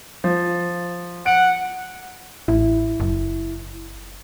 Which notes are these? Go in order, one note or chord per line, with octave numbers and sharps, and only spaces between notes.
F3
F#5 D7
A1 E4
F#1